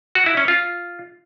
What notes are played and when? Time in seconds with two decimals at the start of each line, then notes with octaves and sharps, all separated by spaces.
0.15 F#4
0.26 E4
0.37 C#4
0.48 F4